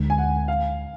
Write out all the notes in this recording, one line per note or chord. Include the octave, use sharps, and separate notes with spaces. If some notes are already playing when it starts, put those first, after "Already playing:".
Already playing: D2 D3 G#3
G#5
F#5
F5